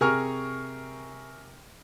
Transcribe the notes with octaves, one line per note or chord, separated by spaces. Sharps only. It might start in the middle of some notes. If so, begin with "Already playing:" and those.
C3 G#4 A#4 G#5 C#6 F6